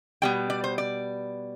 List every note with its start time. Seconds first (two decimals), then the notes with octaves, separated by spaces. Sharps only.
0.22 B2 G3 B3 G5
0.50 D5
0.64 C5
0.78 D5